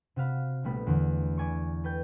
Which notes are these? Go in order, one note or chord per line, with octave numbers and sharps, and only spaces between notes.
C3 F#4 F5 B5
A#1 G3 A3 B3 B5
E2 D3
D5 G#5 B5 C#6
A4 B4 G5 G6